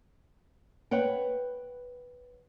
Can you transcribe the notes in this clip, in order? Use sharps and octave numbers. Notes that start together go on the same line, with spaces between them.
B4 C#5 F#5 G5